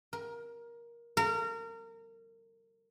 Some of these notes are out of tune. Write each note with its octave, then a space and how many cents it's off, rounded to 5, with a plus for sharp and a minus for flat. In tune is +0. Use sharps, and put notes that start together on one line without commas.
A#4 +15
A#4 -30